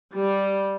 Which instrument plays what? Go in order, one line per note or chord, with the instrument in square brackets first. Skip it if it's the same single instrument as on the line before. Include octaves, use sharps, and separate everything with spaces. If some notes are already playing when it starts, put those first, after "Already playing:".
[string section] G3